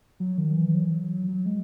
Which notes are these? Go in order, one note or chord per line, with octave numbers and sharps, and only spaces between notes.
F#3
D#3
E3
F#3
F#3
G#3